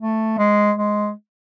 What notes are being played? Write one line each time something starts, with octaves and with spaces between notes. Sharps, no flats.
A3
G#3
G#3